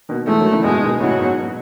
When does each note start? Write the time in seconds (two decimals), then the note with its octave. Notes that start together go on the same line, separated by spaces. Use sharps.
0.09 B2 D#3
0.27 E3 G#3 A3
0.40 D#3 F#3
0.52 C#3 E3
0.64 G#2 B2 G#3
0.83 B2 D#3
1.00 A2 C#3 F#3
1.19 G#2 B2
1.38 B2